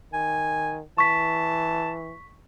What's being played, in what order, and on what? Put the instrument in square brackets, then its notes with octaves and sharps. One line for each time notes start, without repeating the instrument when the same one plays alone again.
[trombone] D#3 [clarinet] G#5
[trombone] E3 [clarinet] A5 [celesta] C#6 B6